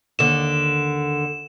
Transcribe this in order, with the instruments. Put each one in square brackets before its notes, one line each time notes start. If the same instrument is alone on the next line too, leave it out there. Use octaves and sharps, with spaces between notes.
[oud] D#2 D3 [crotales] E7